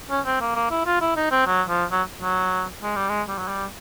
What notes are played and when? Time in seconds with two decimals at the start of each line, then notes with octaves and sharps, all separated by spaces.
0.10 C#4
0.26 C4
0.41 A#3
0.56 A#3
0.71 E4
0.86 F4
1.01 E4
1.16 D#4
1.31 C4
1.46 F#3
1.69 F3
1.91 F#3
2.22 F#3
2.83 G#3
2.96 G3
3.09 G#3
3.28 G3
3.38 F#3
3.48 G3